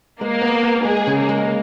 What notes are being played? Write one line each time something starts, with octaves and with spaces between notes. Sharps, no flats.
G#3 A#3
B3
B3
G#3 G#4
C#3
A#3
G#3